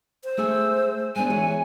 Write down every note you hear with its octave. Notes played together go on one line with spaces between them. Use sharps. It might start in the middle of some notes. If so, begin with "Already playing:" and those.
C5
A3 G#4 G#5 E6
G#3 B3 D4 G#5
E3 G#4 C#5